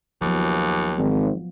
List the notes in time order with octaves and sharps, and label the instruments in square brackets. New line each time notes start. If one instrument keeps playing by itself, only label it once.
[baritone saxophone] D#2 [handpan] F3 F#3 B3
[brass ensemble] G#1